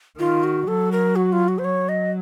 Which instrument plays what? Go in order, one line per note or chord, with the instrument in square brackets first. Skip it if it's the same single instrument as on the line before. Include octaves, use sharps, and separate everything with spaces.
[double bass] D#3 [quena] F4
[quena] F#4
[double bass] F#3 [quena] A4
[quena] A#4
F#4
F4
F#4
C5
[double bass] F#3 [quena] C#5
[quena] D#5